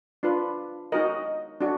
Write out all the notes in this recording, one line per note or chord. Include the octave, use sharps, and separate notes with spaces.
D4 F4 B4
D#4 F#4 A#4 D#5
D4 F#4